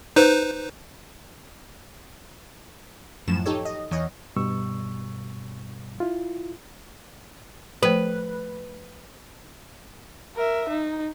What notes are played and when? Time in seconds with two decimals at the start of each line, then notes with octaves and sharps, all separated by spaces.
0.16 D#4 B4 C5
3.28 F#2 A2 F3 E7
3.46 D#4 G4 A4 C#5
3.65 D#5
3.91 E2 C#5 D#5
4.36 G2 B2 G3 C#6 E6
6.00 E4 F4
7.83 F3 A3 B4
10.36 A#4 E5
10.69 D#4